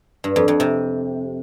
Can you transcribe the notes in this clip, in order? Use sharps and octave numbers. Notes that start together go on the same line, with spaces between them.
G2
F2
F2
C3